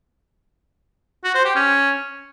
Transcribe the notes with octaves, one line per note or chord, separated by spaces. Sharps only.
F#4
C5
G4
C#4